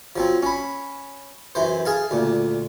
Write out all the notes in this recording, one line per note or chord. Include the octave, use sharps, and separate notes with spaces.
F3 F#3 C4
C#4 B5
F#2 E3 C5
G#4 F5 A5
D2 A#2